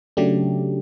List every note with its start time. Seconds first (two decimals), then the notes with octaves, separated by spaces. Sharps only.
0.17 C#3 F#3 A3 D4 G4